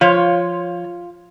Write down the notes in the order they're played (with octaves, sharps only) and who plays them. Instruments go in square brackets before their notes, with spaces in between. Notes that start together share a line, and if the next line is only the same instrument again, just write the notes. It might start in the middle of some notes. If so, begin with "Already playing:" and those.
[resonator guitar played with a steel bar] F3 C#5 [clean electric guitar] F4